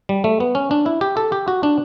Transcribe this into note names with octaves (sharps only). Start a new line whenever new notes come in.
G3
A3
B3
C#4
D4
E4
G4
A4
G4
F#4
D4